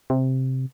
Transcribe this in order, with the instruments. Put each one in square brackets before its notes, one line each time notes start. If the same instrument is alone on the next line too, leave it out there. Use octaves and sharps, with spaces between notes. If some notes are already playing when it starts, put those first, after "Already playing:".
[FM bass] C3